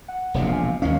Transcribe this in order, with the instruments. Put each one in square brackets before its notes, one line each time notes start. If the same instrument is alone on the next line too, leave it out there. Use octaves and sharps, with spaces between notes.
[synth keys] F#5
[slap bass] E1 A#1 C3
[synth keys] F5 G#5
[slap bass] D#2 G#3 C#4 [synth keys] F5